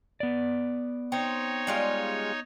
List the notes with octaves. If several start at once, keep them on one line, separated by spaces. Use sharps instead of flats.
B3 D5
C4 D#4 C#5
G3 G#3 F4